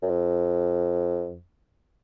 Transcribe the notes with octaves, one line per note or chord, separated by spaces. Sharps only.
F#2
F2